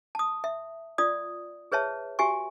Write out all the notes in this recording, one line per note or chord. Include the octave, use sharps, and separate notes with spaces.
A5 D#6
E5
F4 D5 D#6
G#4 B4 C#5 E5 A5
F#4 G4 E5 G#5 C#6